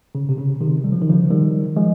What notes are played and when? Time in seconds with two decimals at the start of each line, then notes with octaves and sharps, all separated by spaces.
0.15 C#3
0.29 C3
0.38 C#3
0.61 C3 D#3
0.84 G3
0.92 F3
1.02 D#3
1.09 C#3 F3
1.30 D#3 G3
1.76 F3 G#3